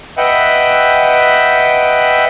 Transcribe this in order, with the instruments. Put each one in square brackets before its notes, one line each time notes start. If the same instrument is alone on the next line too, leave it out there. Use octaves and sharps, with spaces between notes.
[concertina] B4 D#5 E5 F#5 G5